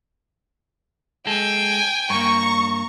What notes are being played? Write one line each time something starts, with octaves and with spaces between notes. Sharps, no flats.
G#3 A4 G5 G#5
G2 A#3 A#5 C#6